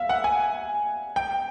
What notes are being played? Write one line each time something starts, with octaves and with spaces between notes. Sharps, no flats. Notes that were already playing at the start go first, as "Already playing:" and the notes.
Already playing: E5 F5
F#5
G#5
G5